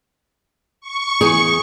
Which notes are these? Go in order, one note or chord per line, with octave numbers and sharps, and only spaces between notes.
C#6
E2 G#4